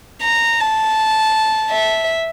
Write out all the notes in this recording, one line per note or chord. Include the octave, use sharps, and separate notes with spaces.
A#5
A5
E5